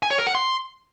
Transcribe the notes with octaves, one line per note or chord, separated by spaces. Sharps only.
G#5
C#5
A#4
F#5
C6